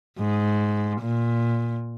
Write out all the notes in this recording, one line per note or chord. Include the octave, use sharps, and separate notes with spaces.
G#2
A#2